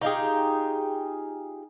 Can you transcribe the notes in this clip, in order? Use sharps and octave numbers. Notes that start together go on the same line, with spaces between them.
D#4 F4 G4 G#4